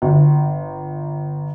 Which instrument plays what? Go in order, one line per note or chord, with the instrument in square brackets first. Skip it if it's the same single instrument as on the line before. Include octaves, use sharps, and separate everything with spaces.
[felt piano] G1